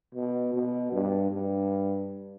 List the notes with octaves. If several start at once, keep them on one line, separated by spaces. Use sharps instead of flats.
B2
B2
G2
G2